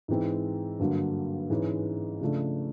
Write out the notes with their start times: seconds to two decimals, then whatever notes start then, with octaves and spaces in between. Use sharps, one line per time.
0.08 G#2 E3 G#3 C4
0.79 G2 D3 F#3 A#3
1.50 G#2 E3 G#3 C#4
2.21 C#3 F3 A3 D4